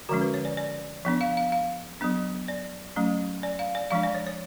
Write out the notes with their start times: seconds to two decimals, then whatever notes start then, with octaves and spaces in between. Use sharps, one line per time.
0.09 D3 F3 G#3 C#4 F#4
0.21 B4
0.34 C#5
0.45 D5
0.57 D5
1.05 F3 B3 D4
1.21 F5
1.37 F5
1.52 F5
2.01 F#3 B3 D4
2.48 D5
2.96 F#3 A3 C#4
3.43 D5
3.59 F5
3.75 D5
3.91 F3 G#3 D4 F5
4.03 D5
4.15 C#5
4.27 C#5